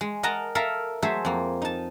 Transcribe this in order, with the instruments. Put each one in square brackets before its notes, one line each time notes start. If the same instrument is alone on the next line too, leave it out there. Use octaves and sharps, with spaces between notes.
[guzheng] G#3
A#4 D#5 F#5 A5 A#5
A4 A#4 E5 F5 A#5
F#3 A3 G#4 C5 E5
F2 A#3
D#4 A5